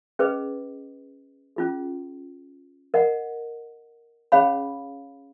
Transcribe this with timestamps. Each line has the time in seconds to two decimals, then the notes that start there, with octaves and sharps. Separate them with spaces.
0.19 C#4 G#4 B4 D#5
1.56 C#4 F4 G#4
2.94 A#4 D#5 F#5
4.32 C#4 G#4 C#5 F5 B5